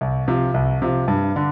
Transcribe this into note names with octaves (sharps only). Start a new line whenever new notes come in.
C2
C3 F3
C2
C3 F3
G2
D3